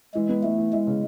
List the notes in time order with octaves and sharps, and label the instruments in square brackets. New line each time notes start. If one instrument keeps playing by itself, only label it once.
[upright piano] E3 [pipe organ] G#3
[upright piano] B3
[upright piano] E3 [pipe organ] A3
[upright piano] E3
[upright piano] E3 [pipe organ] G#3
[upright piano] C#3